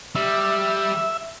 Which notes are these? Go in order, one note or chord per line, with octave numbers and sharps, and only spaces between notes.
G3 E5